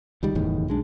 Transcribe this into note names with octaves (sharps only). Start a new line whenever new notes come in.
C#2 D#3 G3
F#1 E2 A2 D#3
B1 G#3 D4